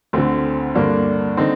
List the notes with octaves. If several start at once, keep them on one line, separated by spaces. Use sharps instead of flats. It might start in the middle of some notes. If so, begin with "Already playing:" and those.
D2 D3 A3 C4
G2 D3 A#3 D4
D3 C4 D#4